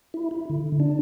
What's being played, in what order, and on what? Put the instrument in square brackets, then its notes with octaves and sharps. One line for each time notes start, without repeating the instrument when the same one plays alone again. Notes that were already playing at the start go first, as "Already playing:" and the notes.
[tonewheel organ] E4
E4
D3
D4